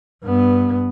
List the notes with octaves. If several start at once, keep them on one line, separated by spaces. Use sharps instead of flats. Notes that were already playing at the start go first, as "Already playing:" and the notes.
G2 B3